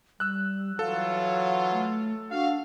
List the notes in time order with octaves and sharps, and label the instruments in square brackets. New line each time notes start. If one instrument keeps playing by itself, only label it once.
[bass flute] G3 [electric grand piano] E6 F#6
[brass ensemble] E3 F#3 F4 [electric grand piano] A4 [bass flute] F5
[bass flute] A3
[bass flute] D4 [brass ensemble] F#4 F5